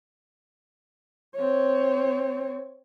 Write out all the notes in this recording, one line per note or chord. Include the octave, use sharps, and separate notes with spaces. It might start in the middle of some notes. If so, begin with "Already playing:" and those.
C4 C#5